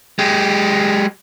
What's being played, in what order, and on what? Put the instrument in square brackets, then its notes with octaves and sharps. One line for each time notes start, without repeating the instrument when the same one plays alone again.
[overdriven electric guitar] G#3 G4